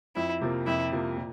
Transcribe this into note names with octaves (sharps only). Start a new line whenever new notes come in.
F2 E4
C3 F3 A#3
F2 E4
C3 F3 A#3
A#2